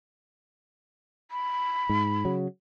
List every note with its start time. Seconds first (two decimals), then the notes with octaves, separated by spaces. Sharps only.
1.31 B5
1.89 G#2
2.25 C#3 F#3